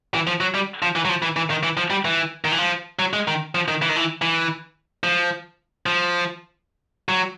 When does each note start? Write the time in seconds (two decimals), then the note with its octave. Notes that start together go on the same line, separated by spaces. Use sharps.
0.14 E3
0.27 F3
0.41 F#3
0.55 G3
0.82 F3
0.96 E3
1.05 F#3
1.09 F3
1.22 E3
1.36 E3
1.50 D#3
1.63 E3
1.77 F3
1.90 G3
2.05 E3
2.45 D#3
2.52 E3
2.59 F3
2.99 F#3
3.13 G#3
3.28 D#3
3.55 F3
3.68 D#3
3.82 E3
3.89 D#3
3.96 E3
4.22 E3
5.04 F3
5.86 F3
7.09 F#3